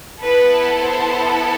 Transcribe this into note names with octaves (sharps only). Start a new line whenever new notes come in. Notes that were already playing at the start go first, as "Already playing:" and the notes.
B3 E4 A4 B4
C5